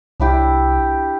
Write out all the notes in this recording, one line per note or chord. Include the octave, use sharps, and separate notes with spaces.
C2 D4 E4 G4